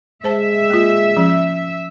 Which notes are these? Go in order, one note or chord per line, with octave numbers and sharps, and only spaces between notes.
G#3 C5 E5 A5
A#3 F4
F3 C#4